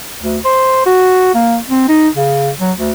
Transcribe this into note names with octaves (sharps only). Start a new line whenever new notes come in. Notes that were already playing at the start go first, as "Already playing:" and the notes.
D2
C5
F#4
A#3
C4
D#4
C#3
F#3
D2